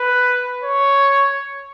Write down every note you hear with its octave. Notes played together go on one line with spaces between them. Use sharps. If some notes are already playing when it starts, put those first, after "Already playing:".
Already playing: B4
C#5